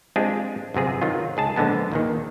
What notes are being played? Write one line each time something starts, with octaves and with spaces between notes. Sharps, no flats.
G#3 C4 D4 F4 G4 G#4
G1 F#2 C3 G#4
D#3 F#3 F4
C#2 G#4 A5
A#1 D3 G#3 B3 A5
D#2 A#2 D#3